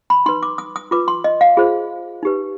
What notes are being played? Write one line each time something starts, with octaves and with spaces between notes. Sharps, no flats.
B5
D#4 B4 C6
D6
D#6
D#6
F4 B4 D6
C6
D#5
F5
F4 G#4 C5
D#4 G4 B4